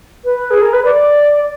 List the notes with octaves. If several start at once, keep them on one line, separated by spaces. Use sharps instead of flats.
B4
G#4
A#4
B4
D5